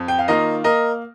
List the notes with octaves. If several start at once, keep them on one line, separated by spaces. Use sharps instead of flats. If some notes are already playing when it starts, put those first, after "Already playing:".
Already playing: F2
G5
F5
D#3 A#3 F4 A#4 D#5
A#3 A#4 D#5